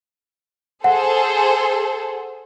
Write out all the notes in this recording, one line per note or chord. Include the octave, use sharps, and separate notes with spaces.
G#4 A4 C5 F#5